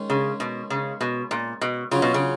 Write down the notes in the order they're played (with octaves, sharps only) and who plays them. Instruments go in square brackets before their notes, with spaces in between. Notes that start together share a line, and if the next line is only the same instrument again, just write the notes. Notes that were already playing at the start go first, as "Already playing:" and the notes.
Already playing: [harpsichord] D#3 G#3 C#4
[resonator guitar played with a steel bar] C#3
B2
C#3
B2
A#2
B2
[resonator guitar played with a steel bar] C#3 [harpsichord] F#3 C#4 F4
[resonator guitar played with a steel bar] B2
C#3